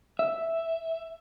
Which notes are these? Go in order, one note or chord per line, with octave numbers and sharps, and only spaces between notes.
E5